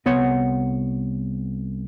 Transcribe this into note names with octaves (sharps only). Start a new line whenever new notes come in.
C2 B3 C#5 F#5